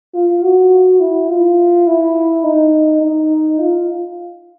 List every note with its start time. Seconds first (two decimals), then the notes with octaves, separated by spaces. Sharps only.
0.14 F4
0.42 F#4
1.00 E4
1.29 F4
1.87 E4
2.44 D#4
3.02 D#4
3.59 F4